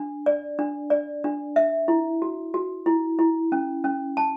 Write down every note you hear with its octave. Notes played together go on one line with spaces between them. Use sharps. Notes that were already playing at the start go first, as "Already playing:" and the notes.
Already playing: D4
D5
D4
D5
D4
E5
E4
F#4
F#4
E4
E4
C#4
C#4
A5